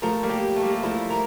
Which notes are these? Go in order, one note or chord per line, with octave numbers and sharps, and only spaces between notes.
F3 A3 A#4
G3 A#3
G4
A3
G3 A#3
F3 A3 E4
A#4